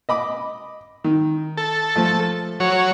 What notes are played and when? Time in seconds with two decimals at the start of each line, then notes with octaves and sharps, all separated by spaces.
0.09 D#5 B5 D6
1.04 D#3
1.57 A4
1.96 F3 A3
2.60 F#3 C#5